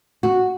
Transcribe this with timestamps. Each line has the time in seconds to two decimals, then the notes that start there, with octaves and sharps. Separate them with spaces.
0.23 F#4